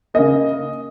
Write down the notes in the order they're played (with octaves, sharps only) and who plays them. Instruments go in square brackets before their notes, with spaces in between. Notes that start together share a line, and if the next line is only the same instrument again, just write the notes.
[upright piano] C#3 A#3 D#5